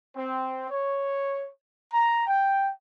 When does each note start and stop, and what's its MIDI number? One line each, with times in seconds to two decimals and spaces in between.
0.16 0.67 60
0.70 1.48 73
1.93 2.27 82
2.27 2.71 79